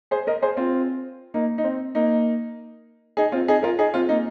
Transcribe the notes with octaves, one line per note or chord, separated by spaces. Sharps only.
G#4 C5
A#4 D#5
G#4 C5
C4 F4
A#3 D#4
D#4
C4
A#3 D#4
D#4 G#4
C4 F4
D#4 G#4
F4 A#4
D#4 G#4
C4 F4
A#3 D#4